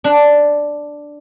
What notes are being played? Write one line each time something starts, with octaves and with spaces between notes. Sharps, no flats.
D4